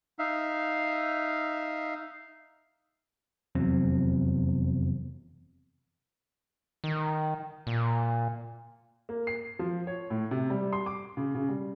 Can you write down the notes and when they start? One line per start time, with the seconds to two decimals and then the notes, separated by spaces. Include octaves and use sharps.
0.19 D#4 E5 F5
3.55 F1 E2 F#3 C4
6.84 D#3
7.67 A#2
9.09 A#3
9.27 C7
9.59 F3
9.87 C#5
10.10 A2
10.31 C3
10.50 G3
10.73 C6
10.86 D6
11.17 C#3
11.35 C#3
11.49 G3